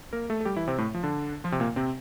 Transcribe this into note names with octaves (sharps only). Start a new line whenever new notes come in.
A#3 A#4
A3 A4
A4
G3 G4
E3 E4
C3 C4
A2 A3
F3
D3 D4
F3 F4
C3 C4
A#2 A#3
C3 C4